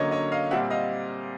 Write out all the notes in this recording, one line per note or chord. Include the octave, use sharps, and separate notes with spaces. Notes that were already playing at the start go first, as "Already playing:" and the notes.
Already playing: D3 F#3 A#3 C#4 C#5 D#5
C#5 D#5
D#5 F5
A#2 G3 C4 E5 F#5
D#5 F5